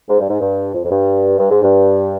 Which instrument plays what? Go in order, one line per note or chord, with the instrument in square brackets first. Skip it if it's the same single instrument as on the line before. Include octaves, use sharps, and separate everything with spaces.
[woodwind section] G#2
G2
G#2
G2
F2
F2
G2
G2
G#2
G2